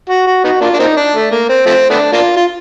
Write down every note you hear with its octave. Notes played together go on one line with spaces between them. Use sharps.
F#4
F#4
B3 D#4 F#4
A#3 D4 F4
D4
A#3 C4 D#4
D4
A3
A#3
C4
F3 A3 C4
A3 B3 D4
A#3 D4 F4
F4